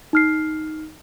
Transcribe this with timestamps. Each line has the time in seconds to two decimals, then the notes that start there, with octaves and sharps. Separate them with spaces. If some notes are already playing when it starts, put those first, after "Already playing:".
0.13 D#4 F6 C7